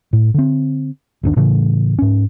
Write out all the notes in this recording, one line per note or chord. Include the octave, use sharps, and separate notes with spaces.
A2
D3 C4
G1 D#2 D4
A2 C#3 E3 A3
G#2 C#4